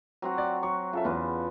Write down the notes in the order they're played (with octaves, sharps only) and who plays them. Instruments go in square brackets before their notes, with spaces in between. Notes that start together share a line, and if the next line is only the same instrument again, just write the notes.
[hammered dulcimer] F#3 C4 F#4
[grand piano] D5
[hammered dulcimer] F#3 [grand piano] C#6
[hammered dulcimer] C#3 [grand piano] F4 A4 E5
[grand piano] E2 [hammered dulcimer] F4 B4 A5